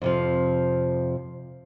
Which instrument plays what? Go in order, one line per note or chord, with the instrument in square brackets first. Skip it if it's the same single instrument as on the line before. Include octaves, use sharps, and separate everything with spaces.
[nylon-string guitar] F2 C3 F3